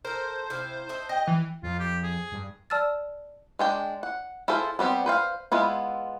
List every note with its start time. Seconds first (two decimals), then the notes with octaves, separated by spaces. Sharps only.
0.05 A4 A#4 C5
0.50 C3 E4 F5
0.89 D4 D#5 E5
1.09 G4 D#5
1.27 E3
1.63 F2 F4
1.79 G4
2.03 G#4
2.32 G2
2.70 D5 A5 E6 F6 A6
3.59 G#3 D4 G5
4.03 F#5
4.48 E4 F4 G#4 A4 C5
4.79 G3 B3 C4 G4
5.06 B4 C5 F5
5.52 G#3 B3 E4 F4